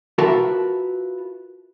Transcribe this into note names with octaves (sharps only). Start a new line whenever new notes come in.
F4 F#4 A#4 B4 E5 A5